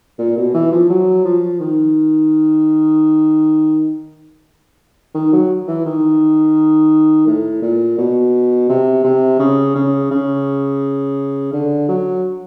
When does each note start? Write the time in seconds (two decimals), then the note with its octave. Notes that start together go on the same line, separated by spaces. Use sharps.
0.19 A#2
0.37 B2
0.54 E3
0.72 F3
0.90 F#3
1.25 F3
1.60 D#3
5.14 D#3
5.33 F#3
5.68 E3
5.86 D#3
7.27 A2
7.62 A#2
7.98 B2
8.70 C3
9.04 C3
9.39 C#3
9.75 C#3
10.11 C#3
11.53 D3
11.88 F#3